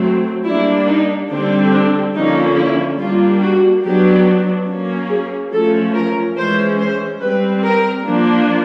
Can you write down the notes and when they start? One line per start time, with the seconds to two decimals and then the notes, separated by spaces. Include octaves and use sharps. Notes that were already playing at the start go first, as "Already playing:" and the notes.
Already playing: F#3 A3 C4
0.45 G3 A#3 D4 E4
0.87 D#4
1.30 D3 G3 C4 D4
1.73 D4
2.15 D3 F3 A#3 C#4 D#4
2.56 E4
2.98 G3 A#3 D4 F4
3.41 F#4
3.84 F#3 B3 D4 G4
4.67 F#3 A#3 C#4
5.09 G#4
5.52 F3 A3 C#4 A4
5.94 A#4
6.36 E3 G#3 C#4 C5
6.78 C5
7.21 G3 C4 B4
7.63 A#4
8.05 F3 A#3 D4